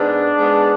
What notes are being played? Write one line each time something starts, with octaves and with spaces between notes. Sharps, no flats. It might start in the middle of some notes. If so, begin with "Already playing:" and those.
Already playing: G#2 G#3 B3 D4
G#2 G#3 B3